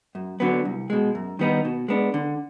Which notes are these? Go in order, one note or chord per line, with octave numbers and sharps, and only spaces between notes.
F#2
D3 F#3 B3
C2
B2 G#3
F#2
D#3 G3 B3 D#4
B2
G#3 B3 D4
D3